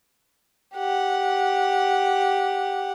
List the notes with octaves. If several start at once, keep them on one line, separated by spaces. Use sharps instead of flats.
G4 F#5